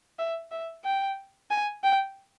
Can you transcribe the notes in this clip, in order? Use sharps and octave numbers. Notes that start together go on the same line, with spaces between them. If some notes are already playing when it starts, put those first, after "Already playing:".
E5
E5
G5
G#5
G5